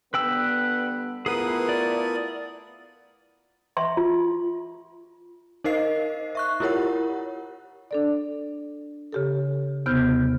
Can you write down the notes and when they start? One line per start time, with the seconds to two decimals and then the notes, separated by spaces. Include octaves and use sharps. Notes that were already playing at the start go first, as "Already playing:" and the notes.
0.14 D3 G3 B3 B4 G5 E6
1.26 A3 B3 E4 F4 G#4 A#4 B4 D#6
1.69 D5
3.77 E5 C6
3.97 F4
5.64 D#4 A#4 C5 D#5 F5 C7
6.35 E5 C#6 F#6
6.60 E4 F4 G4 A#4 C#5 F#5
7.91 D4 A4 D5
9.12 C#3 G4 A4
9.86 D#2 C3 B3 C5 F6 G6